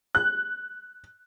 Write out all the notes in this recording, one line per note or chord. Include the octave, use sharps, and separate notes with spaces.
F#6